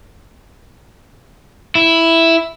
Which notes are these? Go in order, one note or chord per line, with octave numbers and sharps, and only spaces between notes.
E4